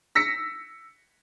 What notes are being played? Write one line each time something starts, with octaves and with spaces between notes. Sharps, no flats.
E6 A#6 B6 C#7